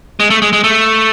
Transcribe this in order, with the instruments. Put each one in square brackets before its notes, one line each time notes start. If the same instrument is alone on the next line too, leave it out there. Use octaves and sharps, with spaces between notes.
[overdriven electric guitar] G#3
A3
G#3
G#3
A3